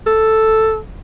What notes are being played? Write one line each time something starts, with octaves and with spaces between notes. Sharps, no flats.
A4